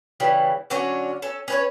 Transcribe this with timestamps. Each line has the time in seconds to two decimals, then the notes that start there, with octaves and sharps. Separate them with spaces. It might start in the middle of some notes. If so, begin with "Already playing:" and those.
0.20 C#3 E3 G3
0.70 D3 F#3 C#4 D4
1.22 C#4 A4
1.48 C#4 B4 C#5